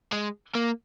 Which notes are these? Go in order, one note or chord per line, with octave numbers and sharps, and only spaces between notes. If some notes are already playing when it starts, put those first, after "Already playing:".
G#3
A#3